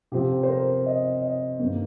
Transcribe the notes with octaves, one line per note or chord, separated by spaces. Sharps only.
C3 F3 C4 G4
C5
A#4
D#5
D#5
G2 D#3 A#3 A#4